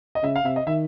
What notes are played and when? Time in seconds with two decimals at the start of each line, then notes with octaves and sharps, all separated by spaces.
0.15 D#5
0.23 C#3 E5
0.36 F5
0.45 C3 E5
0.56 D#5
0.67 D#3 E5